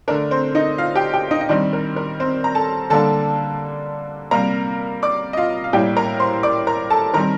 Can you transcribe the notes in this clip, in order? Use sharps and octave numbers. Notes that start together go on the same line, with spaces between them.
D3 A3 D4 A#4
C4 C5
D#4 D#5
F4 F5
G4 G5
G4 G5
D#4 D#5
D#5
D#3 G3 C4 D4 D5
A#4
A#4
C4 C5
A#5
A4 A5
D3 G3 A#3 D4 A4 A5
C3 G3 A#3 A#4 A#5
D5 D6
D#5
F4 F5
F5
A2 G3 A#3 G4 G5
A#4 A#5
C5 C6
D5 D6
A#4 A#5
A4 A5
D#3 G3 C4 A#4 A#5